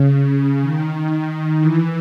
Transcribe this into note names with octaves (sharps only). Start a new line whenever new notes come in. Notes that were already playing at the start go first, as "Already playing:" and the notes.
Already playing: C#3
D#3
E3